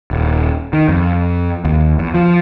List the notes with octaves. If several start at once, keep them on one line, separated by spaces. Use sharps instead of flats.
D#1
D#3
F2
D#2
E2
F3